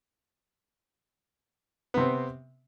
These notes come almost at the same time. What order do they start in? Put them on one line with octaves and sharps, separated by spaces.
B3 C3 C4